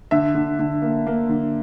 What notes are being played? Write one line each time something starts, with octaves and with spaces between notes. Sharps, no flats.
D3 E5
D3
D3
A#3
A#3
D3